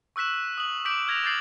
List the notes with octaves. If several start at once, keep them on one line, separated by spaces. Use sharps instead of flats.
C#6 E6 F#6 B6 E7
F#6
D#6 F#7
D6 G6 B6 D7 F#7
F6 G#6 A#6 F7
D6 G6 A6 C7 F#7